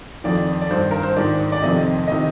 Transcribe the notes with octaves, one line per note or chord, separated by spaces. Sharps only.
F2 D#3 D5
D5
G2 D#3 C5
A#4
C5
G#2 D#3 D5
D5
F2 C3 D#3 D#5
C3 D#3 D#5